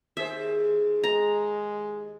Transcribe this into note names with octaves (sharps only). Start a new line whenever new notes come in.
D#2 G#4 C5 E5
G#3 A#5